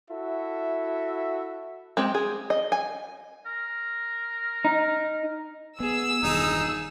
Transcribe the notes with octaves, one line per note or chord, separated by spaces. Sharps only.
E4 F#4 A4 E5
G#3 C4 G4
G#4
D#5
G#5
A#4
D#4
B3 G#4 E6
E1 G2 D#3 D#4 G#4